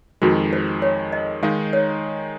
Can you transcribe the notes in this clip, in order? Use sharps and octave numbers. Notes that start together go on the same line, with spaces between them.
F2 D#3 G#3 F#4
C5
C#5
D#5
D#3 G#3 D#4 F5
C#5